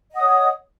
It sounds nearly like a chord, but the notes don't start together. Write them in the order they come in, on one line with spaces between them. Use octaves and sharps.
D#5 F#5 D#6 C#5